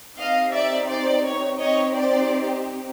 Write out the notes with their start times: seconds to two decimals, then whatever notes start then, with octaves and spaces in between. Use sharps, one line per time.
0.18 C4 D#4 G4 D#5 F5
0.52 D5 E5
0.88 C5 D5
1.24 C#5
1.59 C4 D#4 G4 C#5 D#5
1.94 C5 D5